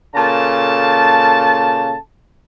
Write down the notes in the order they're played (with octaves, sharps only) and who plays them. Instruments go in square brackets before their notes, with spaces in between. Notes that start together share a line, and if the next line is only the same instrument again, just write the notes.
[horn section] A#2 C#3 A4 A5